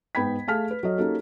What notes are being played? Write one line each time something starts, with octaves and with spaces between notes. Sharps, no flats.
G#2 B3 G5 B5 G#6 B6
A3 G#4 F5 A5 F6 B6
B4
F#3 A4 C#5 D#5
A#3 C#4 D#4 F#4 G4 A4